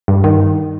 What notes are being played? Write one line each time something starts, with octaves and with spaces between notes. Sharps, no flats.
G2
D#3